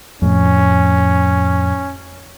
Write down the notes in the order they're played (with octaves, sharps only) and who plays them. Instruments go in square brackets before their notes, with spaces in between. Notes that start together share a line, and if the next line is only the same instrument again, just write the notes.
[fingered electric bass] F2 A2 [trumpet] C#4